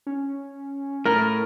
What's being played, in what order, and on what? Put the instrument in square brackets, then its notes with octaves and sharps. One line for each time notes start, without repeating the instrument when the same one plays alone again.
[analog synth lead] C#4
[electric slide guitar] A2 [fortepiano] A#4